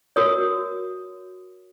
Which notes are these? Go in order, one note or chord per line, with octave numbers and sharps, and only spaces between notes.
F#4 A#4 C#5 D#6